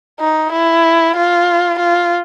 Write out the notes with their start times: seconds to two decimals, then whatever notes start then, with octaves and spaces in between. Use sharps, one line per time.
0.20 D#4
0.53 E4
1.17 F4
1.80 F4